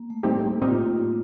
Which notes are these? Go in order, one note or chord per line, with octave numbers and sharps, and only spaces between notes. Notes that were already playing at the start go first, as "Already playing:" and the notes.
Already playing: A#3
A3
A2 G3 A3 C4 D#4 G4
A#3
A2 G3 C4 D#4 F4 G4